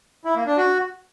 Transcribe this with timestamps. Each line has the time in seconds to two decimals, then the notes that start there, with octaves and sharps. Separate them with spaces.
0.25 E4
0.36 A#3
0.46 D4
0.57 F#4